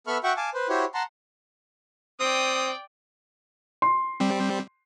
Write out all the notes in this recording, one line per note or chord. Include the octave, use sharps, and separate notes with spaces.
B3 A4 E5 B5 C#6 F6
F#4 E5 F#5 G5 C#6
F5 G#5 A5 D6
B4 C5
E4 F#4 G4 C5 C#5
F#5 A5 A#5 C6
C4 D5 G5 D#6
C6
G3 C4